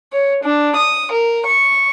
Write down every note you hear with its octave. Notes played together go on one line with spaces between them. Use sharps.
C#5
D4
D#6
A#4
C#6